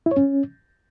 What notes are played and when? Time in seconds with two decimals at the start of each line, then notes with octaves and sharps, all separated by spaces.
0.06 E4
0.11 C#5
0.17 C#4